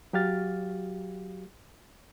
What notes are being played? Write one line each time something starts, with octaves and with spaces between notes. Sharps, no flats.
F#3 F#4 G4 F5 F6 A6